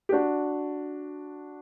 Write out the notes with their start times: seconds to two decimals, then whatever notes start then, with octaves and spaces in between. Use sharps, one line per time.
0.09 G4
0.12 D4 F#4